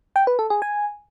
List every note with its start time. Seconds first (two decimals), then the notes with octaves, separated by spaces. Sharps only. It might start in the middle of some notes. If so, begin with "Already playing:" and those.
0.16 G5
0.27 B4
0.39 A4
0.50 G#4
0.62 G#5